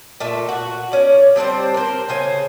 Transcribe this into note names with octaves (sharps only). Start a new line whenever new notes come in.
A#2 A3 E5
F#4
C#4 D5
G3 C4 D4 C5
A#4 C5
C#3 C5 G#5